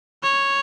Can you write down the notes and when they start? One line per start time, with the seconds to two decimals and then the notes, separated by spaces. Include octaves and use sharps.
0.23 C#5